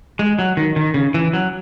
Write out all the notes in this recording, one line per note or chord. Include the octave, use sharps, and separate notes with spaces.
G#3
F#3
D#3
D#3
C#3
E3
F#3